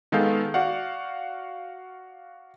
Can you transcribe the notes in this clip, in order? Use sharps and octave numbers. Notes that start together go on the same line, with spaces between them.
D#3 G#3 B3 A4 F5 G6
F#4 D5 F5 F#5